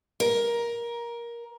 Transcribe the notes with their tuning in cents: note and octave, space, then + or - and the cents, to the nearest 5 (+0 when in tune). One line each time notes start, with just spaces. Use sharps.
A#4 +15